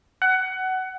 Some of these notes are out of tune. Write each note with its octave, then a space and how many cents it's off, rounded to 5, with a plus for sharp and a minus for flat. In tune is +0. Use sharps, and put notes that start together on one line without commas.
F#5 +20